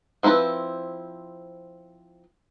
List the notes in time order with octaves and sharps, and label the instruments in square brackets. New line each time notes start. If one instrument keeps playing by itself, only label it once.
[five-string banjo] F3 C4 E4 A4 B4